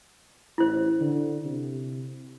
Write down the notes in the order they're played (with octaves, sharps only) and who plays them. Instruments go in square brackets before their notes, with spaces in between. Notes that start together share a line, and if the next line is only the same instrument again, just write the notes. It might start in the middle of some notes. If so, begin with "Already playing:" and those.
[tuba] A1 [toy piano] E4 C5
[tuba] D3
C3